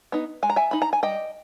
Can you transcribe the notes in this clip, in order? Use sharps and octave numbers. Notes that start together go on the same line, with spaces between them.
B3 D#4
G#3 G#5
A#5
E5 G#5
D#4 B5
A#5
G#5
G3 D#5 G5